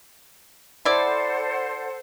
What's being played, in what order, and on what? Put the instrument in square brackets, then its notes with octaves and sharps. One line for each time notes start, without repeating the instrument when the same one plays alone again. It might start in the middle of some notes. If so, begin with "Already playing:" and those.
[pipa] E4 D5 [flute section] A4 C5 F#5